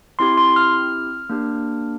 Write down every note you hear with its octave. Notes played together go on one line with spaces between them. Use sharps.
C4 E4 G4 C6
C6
F6
A#3 D4 G4